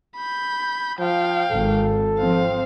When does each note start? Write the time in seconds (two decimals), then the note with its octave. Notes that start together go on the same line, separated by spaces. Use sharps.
0.17 B5 G6
1.00 F3 F5 G5
1.51 G#1 A4
2.19 F3 C4 F5